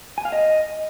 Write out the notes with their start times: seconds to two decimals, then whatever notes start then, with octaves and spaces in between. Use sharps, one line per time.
0.18 G#5
0.25 F5
0.32 D#5